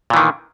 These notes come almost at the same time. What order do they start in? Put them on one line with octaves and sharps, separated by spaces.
A#2 E3 D#3